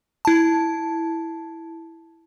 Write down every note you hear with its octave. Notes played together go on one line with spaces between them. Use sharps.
E4 A5